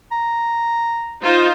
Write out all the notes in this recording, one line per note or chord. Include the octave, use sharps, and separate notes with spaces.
A#5
D#4 F4 C5